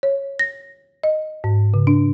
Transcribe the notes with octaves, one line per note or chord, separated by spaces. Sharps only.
C#5
A#6
D#5
G#2
C#3
D4